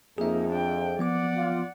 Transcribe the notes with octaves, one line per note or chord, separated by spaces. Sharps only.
F2 A#3 D#4 G#4 E5
D4 G5
F3 B3 D5 F#5 D6
F4